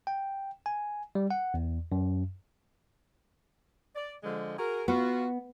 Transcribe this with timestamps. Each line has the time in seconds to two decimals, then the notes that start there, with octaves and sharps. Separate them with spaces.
0.07 G5
0.66 G#5
1.15 G3
1.31 F#5
1.54 E2
1.92 F#2
3.96 D5
4.24 D3 F3 G#3
4.58 F#4 G#4 A#4
4.88 B3 F4 F#4